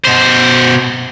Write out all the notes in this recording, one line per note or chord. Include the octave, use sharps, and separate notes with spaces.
B2 C5